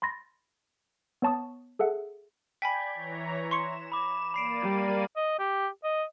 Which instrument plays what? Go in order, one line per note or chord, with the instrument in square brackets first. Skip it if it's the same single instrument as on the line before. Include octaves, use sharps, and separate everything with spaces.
[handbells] B5 C6 A6 A#6
B3 C#5 A5 C#6 D#6
G#4 A4 E5 F#5
[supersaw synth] D5 G6 G#6 [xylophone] G5 G#5 B5 [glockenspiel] B6
[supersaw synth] E3 C#5 A#5
[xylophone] C6 C#6 C#7 [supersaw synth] E7
[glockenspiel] B5 D6
[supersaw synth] A#3 D5 D#7 [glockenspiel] B5 C7 D7
[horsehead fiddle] G3
[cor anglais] D#5
G4
D#5